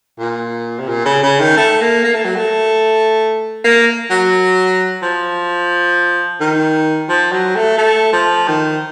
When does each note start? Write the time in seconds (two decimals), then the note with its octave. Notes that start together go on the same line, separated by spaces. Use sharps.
0.20 A#2
0.79 C3
0.89 A#2
1.06 C#3
1.23 C#3
1.40 D#3
1.57 A3
1.81 A#3
2.04 A#3
2.14 A3
2.25 F#3
2.36 A3
3.64 A#3
4.10 F#3
5.02 F3
6.40 D#3
7.09 F3
7.32 F#3
7.56 A3
7.78 A3
8.13 F3
8.48 D#3